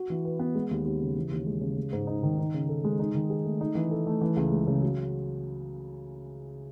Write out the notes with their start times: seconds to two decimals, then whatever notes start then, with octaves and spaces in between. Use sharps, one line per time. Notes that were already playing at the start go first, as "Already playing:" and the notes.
Already playing: F#4
0.10 E3
0.25 B4
0.39 B3
0.55 G#3
0.71 D#2
0.85 D#2
1.00 C#3
1.17 E3
1.31 D#2
1.47 G#3
1.61 C#3
1.77 G#3
1.93 G#2
2.07 D#4
2.23 D#3
2.39 D#4
2.54 C#3
2.69 A4
2.84 G#3
2.99 D#4
3.14 D#3
3.30 G#4
3.45 A3
3.61 D#4
3.75 E3
3.91 A4
4.07 A3
4.21 E3
4.36 C#2
4.52 G#3
4.67 C#3
4.82 F#3